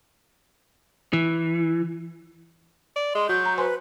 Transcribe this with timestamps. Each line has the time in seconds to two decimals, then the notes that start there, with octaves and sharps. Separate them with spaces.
1.13 E3
2.96 D5
3.15 G#3 C6
3.29 F#3 F#4 G6
3.46 A#5
3.58 B4 C5 G#5 C6